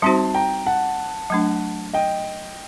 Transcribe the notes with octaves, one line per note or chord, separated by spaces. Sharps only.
G3 C4 D#4 F#4 C5 A5 C6
G5 A#5
F#5 A5
F#3 A3 D4
D#5 G5